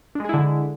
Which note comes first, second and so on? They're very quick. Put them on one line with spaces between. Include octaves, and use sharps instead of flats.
D4 G#3 G#4 E4 D3